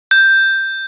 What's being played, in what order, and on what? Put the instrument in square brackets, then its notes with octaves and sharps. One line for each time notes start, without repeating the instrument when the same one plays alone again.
[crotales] G6